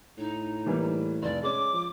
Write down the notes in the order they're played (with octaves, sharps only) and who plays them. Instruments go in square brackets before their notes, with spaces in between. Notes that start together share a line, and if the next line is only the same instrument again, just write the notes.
[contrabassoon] A2 [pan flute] D#4
[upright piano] E3 G3 A#3
[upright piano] F1 [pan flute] D5
[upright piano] G#3 C#4 [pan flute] D6
[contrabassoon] F3